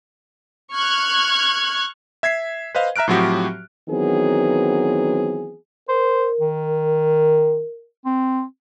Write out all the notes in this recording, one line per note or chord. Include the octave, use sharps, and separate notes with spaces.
C#6 F6 F#6 G#6
E5 G#6 B6 C7
B4 C5 D#5 F5
E5 A#5 F6 F#6 D7
A2 F3 F#3 C4 F#4 G4
D#3 E3 F#3 B3 C4 G#4
A#4 C5
D#3
C4